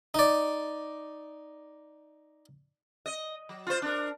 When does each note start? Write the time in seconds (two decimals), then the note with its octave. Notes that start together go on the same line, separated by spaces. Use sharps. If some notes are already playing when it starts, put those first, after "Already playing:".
0.14 D#4 D5
3.06 D#5
3.49 F#3
3.67 F4 C5
3.82 D4 A#4